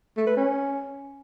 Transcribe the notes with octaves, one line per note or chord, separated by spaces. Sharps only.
A3
B4
C#4